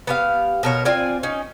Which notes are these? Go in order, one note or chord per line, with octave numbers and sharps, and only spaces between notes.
B3 G4 F5
B2 A#4 C#5
C4 F4 D5 G#5
C#4 D#4